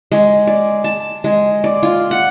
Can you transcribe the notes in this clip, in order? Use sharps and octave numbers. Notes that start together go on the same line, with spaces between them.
G#3
D5
A5
G#3
D5
F4
F#5